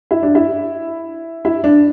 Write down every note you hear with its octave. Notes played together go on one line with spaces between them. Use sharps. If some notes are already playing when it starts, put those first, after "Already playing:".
E4
D4
E4
E4
D4